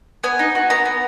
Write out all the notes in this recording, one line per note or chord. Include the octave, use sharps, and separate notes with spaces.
B3 G#5
D#4
F#4
B3 A#5
B3